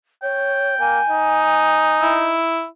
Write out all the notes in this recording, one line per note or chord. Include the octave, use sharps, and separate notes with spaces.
C#5 G5
A#3 G#5
D#4
E4